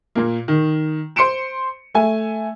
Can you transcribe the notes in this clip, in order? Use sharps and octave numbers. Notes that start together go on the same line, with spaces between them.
A#2 A#3
D#3
C5 C6 C#7 D7 E7
A3 G#5